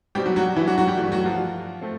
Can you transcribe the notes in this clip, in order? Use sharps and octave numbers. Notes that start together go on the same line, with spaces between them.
B2 G3 C4 G4
F#3 F#4
F#3 F#4
E3 E4
F#3 F#4
F#3 F#4
G3 G4
G2 E3 F#3 A3 F#4
F#3 F#4
F3 F4
A3 C4